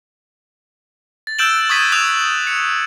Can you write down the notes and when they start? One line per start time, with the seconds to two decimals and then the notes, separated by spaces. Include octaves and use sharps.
1.27 A6
1.39 E6 F#6 G6 D7 E7 F#7
1.69 C#6 D#6 G#6 B6 D#7
1.92 D#6 F#6 E7 F7
2.47 C#7